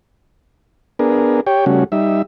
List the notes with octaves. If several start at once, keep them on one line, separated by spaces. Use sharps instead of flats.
B3 D4 G#4 A#4
G4 C#5 G5
C#3 G3 A3 C#4 F#4
G3 D#4 E5